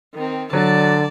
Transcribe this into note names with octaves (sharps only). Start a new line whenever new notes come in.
D#3 C4
D3 F#3 D5 A5